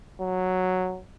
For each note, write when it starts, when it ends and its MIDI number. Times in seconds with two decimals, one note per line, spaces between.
0.21 1.00 54